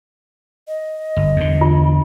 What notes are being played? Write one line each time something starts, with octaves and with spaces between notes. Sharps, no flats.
D#5
G1
E2 D3
F4